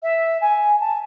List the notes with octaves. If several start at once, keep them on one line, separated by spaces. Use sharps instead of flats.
E5
G#5
A5